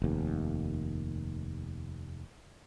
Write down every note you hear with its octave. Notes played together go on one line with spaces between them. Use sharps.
F1 D#2